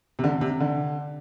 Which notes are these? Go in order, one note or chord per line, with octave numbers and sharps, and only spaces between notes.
C3
D3
C3
D3